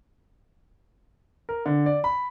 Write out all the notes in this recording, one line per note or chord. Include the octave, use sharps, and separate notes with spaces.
A#4
D3
D5
B5